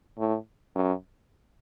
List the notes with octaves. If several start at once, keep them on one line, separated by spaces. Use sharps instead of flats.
A2
F#2